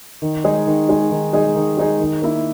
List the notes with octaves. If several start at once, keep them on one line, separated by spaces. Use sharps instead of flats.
D#3
G#3 D#4 G#4
D#3
G#3 D#4 G#4
D#3
G#3 D#4 G#4
D#3
G#3 D#4 G#4
D#3
A#3 E4